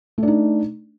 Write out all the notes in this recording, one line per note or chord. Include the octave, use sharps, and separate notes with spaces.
A3 D4 D#4